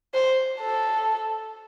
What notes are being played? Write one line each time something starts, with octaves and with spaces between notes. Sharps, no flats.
C5
A4